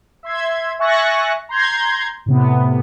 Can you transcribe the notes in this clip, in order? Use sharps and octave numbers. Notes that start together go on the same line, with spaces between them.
E5 C6 G#6
E5 G#5 C#6 F#6 A6 A#6
A#5 C6 G6 G#6
A2 C3 B3